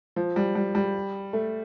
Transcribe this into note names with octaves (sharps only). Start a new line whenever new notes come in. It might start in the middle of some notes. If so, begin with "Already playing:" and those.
F3
G3
G3
G3
A3